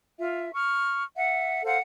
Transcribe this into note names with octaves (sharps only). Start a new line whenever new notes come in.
F4 E5
C#6 F6
E5 F#5
A4 C5 F5 F#5